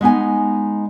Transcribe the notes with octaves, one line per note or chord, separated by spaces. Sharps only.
G#3 B3 D#4 G#5